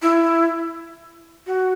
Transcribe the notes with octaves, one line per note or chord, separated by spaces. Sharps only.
E4
F#4